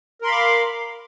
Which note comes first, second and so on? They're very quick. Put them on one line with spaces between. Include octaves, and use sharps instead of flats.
A#4 C6 B5 F5 D6